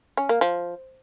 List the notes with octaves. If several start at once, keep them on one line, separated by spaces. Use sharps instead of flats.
C#4
A#3
F3